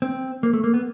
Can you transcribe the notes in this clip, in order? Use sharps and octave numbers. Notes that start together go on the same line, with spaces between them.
C4
A#3
A3
A#3
B3